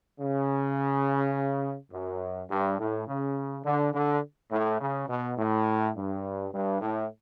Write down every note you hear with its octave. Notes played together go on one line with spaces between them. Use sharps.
C#3
F#2
G2
A2
C#3
D3
D3
A2
C#3
B2
A2
G2
G2
A2